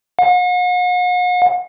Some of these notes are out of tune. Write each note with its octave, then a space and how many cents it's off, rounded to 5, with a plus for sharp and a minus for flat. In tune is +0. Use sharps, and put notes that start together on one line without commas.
F#5 -45